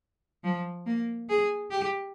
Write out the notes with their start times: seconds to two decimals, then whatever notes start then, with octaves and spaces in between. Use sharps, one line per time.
0.44 F3
0.86 A#3
1.29 G#4
1.71 G4